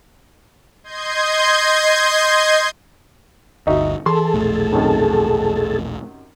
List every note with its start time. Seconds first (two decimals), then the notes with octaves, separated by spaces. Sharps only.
0.84 D#5 C6 G6 G#6
3.67 G1 D2 D#4 F#4 E5
4.06 E3 G#4 A4 A5 C6
4.34 E1 A#1 A3
4.73 F#2 C3 D#3